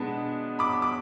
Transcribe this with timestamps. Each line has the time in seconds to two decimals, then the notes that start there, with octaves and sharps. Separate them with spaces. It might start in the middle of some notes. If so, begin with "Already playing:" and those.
Already playing: B2 G#3 B3 D4 A5 B5
0.59 B5 D6
0.82 D6